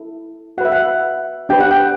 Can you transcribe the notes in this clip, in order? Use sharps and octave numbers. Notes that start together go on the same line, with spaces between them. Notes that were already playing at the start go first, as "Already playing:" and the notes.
Already playing: E4 A4
F#4 B4 E5 F#5
F#5
D4 G4 B4 G5
F#5
G5